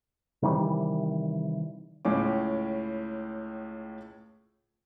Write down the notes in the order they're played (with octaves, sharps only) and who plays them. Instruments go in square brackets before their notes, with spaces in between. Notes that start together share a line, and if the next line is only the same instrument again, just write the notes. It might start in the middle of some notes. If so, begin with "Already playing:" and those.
[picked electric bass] C3 D#3 E3 G3
[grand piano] C#2 A2 C#4 D6